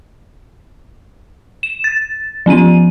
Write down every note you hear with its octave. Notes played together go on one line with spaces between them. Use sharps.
E7
A6
F3 B3 C#4 D#7